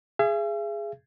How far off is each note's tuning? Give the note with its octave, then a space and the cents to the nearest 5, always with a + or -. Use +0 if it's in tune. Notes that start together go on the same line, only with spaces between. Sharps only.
G#4 +0 E5 +45